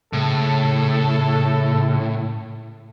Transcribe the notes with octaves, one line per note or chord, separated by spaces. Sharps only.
A2 C#3 A4